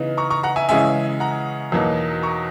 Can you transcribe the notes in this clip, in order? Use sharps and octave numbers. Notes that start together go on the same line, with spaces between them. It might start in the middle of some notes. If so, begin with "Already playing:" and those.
Already playing: C#3 E3 B3 D#4
A#5 C#6
A#5 C#6
F#5 A#5
E5 G#5
C#3 E3 G#3 C#4 E5 G#5
F#5 A#5
E2 B2 F#3 A#3 D#4
A#5 C#6